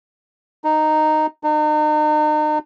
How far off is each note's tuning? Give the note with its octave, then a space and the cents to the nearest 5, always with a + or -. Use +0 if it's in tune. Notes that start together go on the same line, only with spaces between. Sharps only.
D#4 -10
D#4 -40